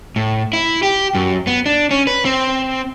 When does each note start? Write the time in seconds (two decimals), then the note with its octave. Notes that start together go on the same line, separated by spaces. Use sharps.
0.16 A2
0.53 E4
0.83 G4
1.15 F#2
1.47 B3
1.66 D4
1.91 C#4
2.07 B4
2.25 C4